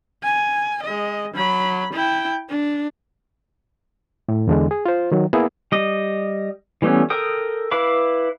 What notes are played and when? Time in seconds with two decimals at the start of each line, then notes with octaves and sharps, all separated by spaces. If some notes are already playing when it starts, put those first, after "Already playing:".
0.23 G#5
0.83 G#3 D#5
1.34 F#3 B5
1.93 E4 G5
2.50 D4
4.29 A2
4.47 E2 D3 G#3
4.71 G#4
4.86 F4 C5
5.12 D#3 F#3
5.33 A#3 B3 E4 G#4
5.72 G3 D#5
6.82 E3 G3 A3 B3 C#4
7.10 A4 A#4 G5 D#6
7.71 E4 B4 F5 B5 D6